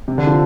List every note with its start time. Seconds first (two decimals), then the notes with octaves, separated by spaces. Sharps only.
0.08 C3
0.18 D3
0.27 F3